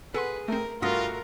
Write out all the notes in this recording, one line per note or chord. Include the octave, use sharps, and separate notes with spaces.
G#4 A4 B4 F#5 C6
A3 C4 A#4
G2 G3 A3 F4 F#4 A#4 D#6 A#6